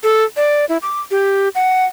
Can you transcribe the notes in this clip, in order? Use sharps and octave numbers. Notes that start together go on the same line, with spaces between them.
A4
D5
E4
D6
G4
F#5